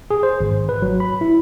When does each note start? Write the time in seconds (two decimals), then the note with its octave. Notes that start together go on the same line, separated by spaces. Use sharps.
0.11 G#4
0.23 C5
0.40 G#1
0.69 B4
0.82 F#3
1.00 B5
1.21 E4